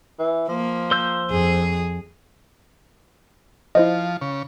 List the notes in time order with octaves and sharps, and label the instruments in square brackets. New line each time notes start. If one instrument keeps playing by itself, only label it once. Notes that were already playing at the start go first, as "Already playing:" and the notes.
[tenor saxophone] E3
[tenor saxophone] F3 [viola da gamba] A#3
[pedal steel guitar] C5 E6 G6
[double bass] F2 [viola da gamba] G#4
[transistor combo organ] F3 [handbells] E4 C5 D#5
[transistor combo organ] C#3